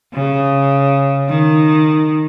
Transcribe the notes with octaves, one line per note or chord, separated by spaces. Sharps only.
C#3
D#3